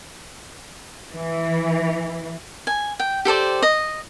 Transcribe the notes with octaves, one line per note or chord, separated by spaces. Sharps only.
E3
G#5
G5
G4 A4 C5 D5
D#5